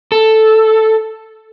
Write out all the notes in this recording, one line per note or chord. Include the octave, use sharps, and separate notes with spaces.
A4